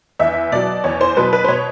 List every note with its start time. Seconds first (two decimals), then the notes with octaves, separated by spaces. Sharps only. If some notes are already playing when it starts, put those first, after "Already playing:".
0.19 E2 E5
0.52 B2 F#3 D5
0.84 E2 C#5
1.01 C5
1.17 B2 F#3 B4
1.33 B4
1.44 C5
1.48 B2 C#5